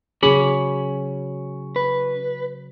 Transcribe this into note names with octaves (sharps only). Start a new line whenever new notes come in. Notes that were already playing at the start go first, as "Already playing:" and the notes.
C#3 F#3 C#4 G#4 B5
B4